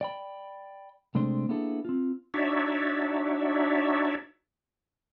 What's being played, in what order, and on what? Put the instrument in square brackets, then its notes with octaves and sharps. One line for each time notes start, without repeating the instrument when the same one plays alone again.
[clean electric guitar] D5 G5 B5
C3 G#3 A3 D4 C5
A#3 B3 D4 E4 G#4 A4
C4 F4
[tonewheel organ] D4 D#4 F#4 C#5 D5 E5